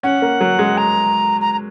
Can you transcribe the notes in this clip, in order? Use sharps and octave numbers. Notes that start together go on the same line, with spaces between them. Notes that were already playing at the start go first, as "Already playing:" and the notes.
C#4 F#5
A#3
F#3
G#3
A#5
A#5
A#5